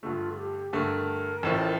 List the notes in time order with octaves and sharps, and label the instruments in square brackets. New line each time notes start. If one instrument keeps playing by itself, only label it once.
[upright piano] G2 D3 A3 [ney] F4
[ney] A4
G4
[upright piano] G2 D3 A3 [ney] A#4
[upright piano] A1 A2 F3